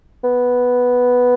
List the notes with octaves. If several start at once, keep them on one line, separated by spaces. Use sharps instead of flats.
B3